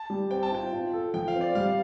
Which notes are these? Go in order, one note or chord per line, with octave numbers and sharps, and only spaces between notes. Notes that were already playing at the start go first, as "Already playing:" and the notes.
Already playing: A5
G3
C4 G5
A5
F4 G5
F4
A4
F3 G5
F5
C4
D5
G3 F5